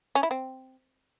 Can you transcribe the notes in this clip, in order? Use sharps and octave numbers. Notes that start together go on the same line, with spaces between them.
C#4
E4
C4